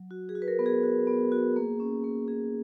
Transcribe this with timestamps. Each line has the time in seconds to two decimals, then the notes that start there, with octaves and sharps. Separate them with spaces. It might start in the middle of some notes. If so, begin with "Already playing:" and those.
Already playing: F#3
0.11 F#4
0.29 G#4
0.35 F#4
0.42 B4
0.48 A#4
0.59 B3
0.66 G#4
0.83 F#4
1.07 B3
1.32 F#4
1.56 A#3
1.80 C#4
2.04 A#3
2.28 C#4 G#4